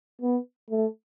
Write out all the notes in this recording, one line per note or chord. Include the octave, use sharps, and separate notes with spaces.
B3
A3